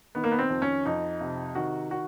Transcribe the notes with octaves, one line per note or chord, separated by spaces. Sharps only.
D#3 B3
A#3
B3
C4
F2
C#4
F2 D#4
C3
D#3 F#4
F#4